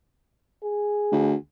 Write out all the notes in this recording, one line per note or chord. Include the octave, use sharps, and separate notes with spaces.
G#4
D2